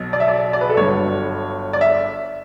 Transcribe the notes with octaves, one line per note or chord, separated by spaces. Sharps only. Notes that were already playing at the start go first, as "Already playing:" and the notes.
Already playing: B1 B2 F#3
D5
E5
D5
D5
B4
A4
G1 G2 F#3 C#5
D5
E5